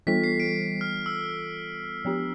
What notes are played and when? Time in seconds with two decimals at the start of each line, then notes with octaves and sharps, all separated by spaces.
0.07 E3 G3 B3 F4 A4 B6
0.24 C7
0.40 D7
0.81 F6
1.06 E6
2.05 F3 B3 D4 G4